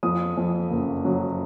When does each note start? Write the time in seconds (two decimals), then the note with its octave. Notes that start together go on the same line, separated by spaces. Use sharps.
0.03 F2 D#6
0.37 F2
0.71 F#1
1.05 F#3